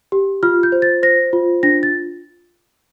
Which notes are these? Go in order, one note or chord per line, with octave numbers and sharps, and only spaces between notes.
G4
F4 F6
G6
C5
A6
C5 A#6
F4
D4 A#6
A6